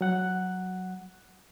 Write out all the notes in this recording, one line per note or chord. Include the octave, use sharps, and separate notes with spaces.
F#3 F#5 F#6